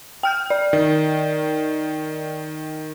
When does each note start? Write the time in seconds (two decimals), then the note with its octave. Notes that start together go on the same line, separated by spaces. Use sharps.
0.23 G5 F6 G6
0.50 D5
0.73 D#3